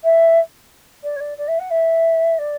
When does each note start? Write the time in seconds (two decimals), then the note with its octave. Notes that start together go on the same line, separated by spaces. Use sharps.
0.03 E5
1.03 D5
1.16 C#5
1.20 D5
1.37 D5
1.48 E5
1.59 F#5
1.70 E5
2.38 D5